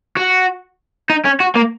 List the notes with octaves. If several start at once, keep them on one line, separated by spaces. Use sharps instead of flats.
F#4
D#4
C#4
F#4
A#3